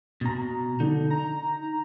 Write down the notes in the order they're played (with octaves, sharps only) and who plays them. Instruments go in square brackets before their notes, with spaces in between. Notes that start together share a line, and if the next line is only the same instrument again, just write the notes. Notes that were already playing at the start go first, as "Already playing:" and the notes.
[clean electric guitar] B2 A#5
[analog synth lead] D3 [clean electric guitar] D#4
[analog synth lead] A#5